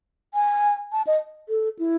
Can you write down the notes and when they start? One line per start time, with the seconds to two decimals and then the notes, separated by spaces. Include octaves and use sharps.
0.34 G#5
0.92 A5
1.07 D#5
1.49 A4
1.79 E4